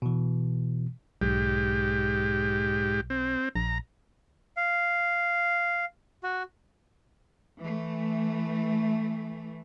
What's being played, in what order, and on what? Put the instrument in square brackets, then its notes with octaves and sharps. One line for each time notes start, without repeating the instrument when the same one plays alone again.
[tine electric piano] B2 E3
[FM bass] B1 [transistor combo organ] G#2 G4
[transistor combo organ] C4
[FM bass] A#1 [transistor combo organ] A#5
[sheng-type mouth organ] F5
F#4
[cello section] E3 A3